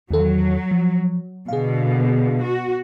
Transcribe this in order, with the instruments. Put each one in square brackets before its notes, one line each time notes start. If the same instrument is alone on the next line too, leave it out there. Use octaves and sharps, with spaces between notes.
[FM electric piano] E2 D#3 A4 [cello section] F#3
[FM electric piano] F3
[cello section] B2 D3 [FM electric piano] G#4 F5
[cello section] F#4